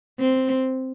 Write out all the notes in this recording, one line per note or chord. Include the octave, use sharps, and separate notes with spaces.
C4